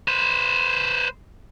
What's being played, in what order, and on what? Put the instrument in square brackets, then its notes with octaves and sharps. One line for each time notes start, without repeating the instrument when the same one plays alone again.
[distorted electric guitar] B4 C5